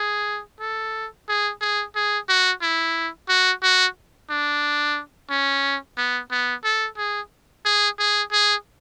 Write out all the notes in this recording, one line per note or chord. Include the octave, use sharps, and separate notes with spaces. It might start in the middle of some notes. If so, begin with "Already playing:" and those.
Already playing: G#4
A4
G#4
G#4
G#4
F#4
E4
F#4
F#4
D4
C#4
B3
B3
A4
G#4
G#4
G#4
G#4